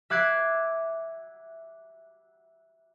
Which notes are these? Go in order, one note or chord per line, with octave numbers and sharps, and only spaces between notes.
E5 D6 F#6 G#6 C7